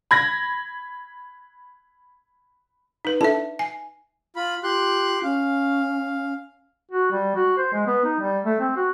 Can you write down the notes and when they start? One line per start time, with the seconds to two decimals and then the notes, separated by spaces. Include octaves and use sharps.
0.11 B5 G#6 A#6
3.05 D#4 B4
3.21 D4 E4 A4 E5 A5
3.59 G#5 C7
4.36 F4 B5
4.63 F4 G4 C6 F#6
5.23 C#4 F5
6.91 F#4
7.12 G3
7.36 F#4
7.57 C5
7.73 G#3
7.87 B3
8.05 D#4
8.20 G3
8.45 A3
8.60 C4
8.76 F#4